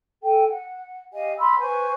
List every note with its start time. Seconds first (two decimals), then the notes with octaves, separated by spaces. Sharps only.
0.22 A4 G5 G#5
0.48 F#5
1.13 G4 D#5 F5 G#5
1.37 B5 C6 E6
1.57 B4 C5 G#5 C#6